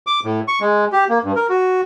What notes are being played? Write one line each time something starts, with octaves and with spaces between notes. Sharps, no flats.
D6
A2
C#6
G#3
G4
A#3
G2
A#4
F#4